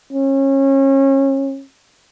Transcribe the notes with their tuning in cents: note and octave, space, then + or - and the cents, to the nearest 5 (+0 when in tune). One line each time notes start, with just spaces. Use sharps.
C#4 -30